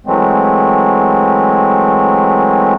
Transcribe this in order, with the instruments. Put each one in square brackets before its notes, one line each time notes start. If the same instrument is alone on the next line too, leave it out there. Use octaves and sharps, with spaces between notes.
[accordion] E3 F#3 G#3 A3 C4